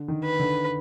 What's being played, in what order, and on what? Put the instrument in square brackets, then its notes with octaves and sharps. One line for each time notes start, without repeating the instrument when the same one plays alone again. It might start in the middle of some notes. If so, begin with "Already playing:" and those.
Already playing: [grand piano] D3
D#3
[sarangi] B4
[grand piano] D3